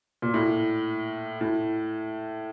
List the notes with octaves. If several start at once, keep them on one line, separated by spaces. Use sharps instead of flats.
A#2
A2
A2